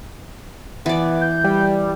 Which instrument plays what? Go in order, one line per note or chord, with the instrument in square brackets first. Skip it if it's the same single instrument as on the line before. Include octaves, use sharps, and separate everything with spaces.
[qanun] E3 D5 [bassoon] B3
[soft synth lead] G6
[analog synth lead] G3 [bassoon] G4